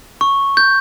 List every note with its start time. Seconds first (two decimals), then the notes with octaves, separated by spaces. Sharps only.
0.21 C#6
0.57 G6